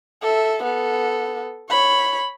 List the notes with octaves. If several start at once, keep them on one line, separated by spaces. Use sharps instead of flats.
A4 E5
B3 A4
C#5 B5